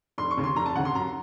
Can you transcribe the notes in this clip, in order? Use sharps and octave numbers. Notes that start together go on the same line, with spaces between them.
F1 C6
C#6
D#2 C#3
C6
F1 A#5
A5
D#2 C#3 F#5
C6
F#2 A#5